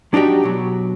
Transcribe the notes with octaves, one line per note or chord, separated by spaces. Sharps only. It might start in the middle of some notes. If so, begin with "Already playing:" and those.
F#3 D4 D#4 F#4 G4
B2 F#3